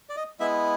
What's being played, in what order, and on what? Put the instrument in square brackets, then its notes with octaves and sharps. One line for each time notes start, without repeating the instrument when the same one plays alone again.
[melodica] D5
D#5
G#3 B3 E4 E5